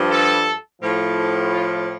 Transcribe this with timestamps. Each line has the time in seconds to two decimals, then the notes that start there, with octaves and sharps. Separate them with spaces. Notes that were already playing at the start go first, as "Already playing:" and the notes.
Already playing: G2 F3
0.09 A4
0.81 A2 F3
1.52 F4